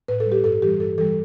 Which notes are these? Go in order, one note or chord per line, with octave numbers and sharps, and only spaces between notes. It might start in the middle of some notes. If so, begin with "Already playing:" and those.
A2 B4
A4
G3
G4
G2 A4
E3 G3 G4
G2 A4
E3 G3 A4